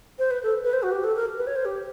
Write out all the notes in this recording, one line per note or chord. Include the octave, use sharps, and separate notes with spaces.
C5
B4
A4
B4
C5
F#4
G4
A4
A#4
B4
C#5
C5
G4